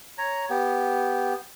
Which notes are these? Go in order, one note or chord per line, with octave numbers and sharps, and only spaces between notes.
C#5 A#5
B3 G4